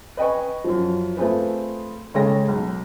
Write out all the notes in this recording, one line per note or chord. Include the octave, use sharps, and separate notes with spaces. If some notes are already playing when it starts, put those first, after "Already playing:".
B4 D#5 G5 G#5 C#6
F#2 F3
A3 C4 F4 G#4 B4
C#3 G#3 A4 C#5 G5 A#6
B1